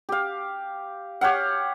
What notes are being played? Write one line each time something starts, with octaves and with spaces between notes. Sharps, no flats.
G4 F5
G4 C#5 F5 F#5